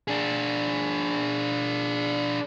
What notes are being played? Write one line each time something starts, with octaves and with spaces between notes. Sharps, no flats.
D4 G#4